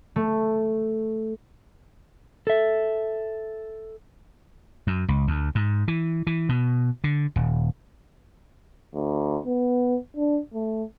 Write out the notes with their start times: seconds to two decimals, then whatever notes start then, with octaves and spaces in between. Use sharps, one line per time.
0.16 A3
2.47 A4 E5
4.87 F#2
5.09 C#2
5.27 D2
5.55 G#2
5.88 E3
6.27 E3
6.49 B2
7.04 D3
7.36 D#1
8.94 D2
9.46 B3
10.16 D4
10.54 A3